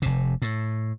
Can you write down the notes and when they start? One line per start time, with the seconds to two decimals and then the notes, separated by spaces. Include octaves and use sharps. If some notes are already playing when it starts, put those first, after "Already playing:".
0.02 F1 C3
0.42 A2